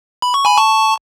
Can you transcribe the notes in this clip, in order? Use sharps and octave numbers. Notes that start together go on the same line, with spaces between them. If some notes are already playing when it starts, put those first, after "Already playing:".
B5
C#6
G#5 B5
A5 C#6